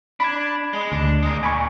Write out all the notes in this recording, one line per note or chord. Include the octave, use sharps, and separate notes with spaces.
D4 B5 G#6
G#3
D2 D4
G#3 A#4
A#2 G#5 B5 C#6